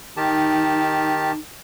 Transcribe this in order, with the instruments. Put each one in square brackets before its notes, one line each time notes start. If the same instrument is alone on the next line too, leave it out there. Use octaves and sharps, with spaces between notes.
[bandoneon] D#3 G4 A5 [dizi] D#4